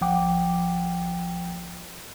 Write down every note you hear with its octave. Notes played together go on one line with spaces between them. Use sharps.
B1 F3 F#5 G5 D6